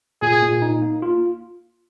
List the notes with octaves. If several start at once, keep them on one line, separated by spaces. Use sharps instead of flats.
A#2 G#4
A#2
D#4
A#3
F4